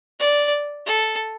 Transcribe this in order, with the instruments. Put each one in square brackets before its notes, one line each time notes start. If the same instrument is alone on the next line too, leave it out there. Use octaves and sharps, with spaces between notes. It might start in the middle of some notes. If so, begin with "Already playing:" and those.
[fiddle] D5
A4